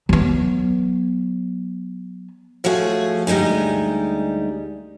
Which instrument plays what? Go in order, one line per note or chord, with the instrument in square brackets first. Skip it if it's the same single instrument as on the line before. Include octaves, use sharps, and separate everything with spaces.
[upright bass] F#3 B3
[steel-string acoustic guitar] A2 F3 A3 F#4 G#4
D2 G3 G#3 D#4 G#5